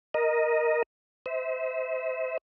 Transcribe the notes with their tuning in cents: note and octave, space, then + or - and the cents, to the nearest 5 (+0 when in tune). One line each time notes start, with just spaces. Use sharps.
A#4 +5 D#5 +0
C5 -20 E5 -35